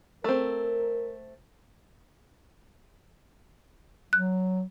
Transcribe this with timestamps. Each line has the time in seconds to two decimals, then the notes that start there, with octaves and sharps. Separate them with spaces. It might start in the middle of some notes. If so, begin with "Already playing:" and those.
0.24 A3 C4 A#4
4.13 F#3 F#6